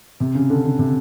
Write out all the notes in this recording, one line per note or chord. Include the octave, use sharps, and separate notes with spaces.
C3
C#3
D3
C#3
C3